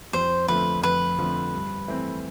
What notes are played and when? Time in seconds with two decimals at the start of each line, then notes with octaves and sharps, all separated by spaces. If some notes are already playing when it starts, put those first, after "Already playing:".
0.13 F2 C5
0.48 D3 F3 A3 C4 B4
0.82 F2 B4
1.18 D3 F3 A3 C4
1.54 G2
1.88 E3 A3 C4